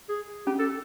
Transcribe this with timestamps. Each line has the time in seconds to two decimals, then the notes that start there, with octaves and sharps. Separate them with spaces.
0.09 G#4
0.46 C#4 G4
0.59 A4